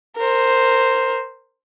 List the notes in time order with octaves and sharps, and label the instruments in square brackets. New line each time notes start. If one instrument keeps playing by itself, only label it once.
[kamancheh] A#4 C5